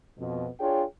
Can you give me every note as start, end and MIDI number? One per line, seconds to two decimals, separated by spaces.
0.19 0.47 41
0.19 0.47 47
0.59 0.83 62
0.59 0.83 65
0.59 0.83 68
0.59 0.83 73
0.59 0.83 79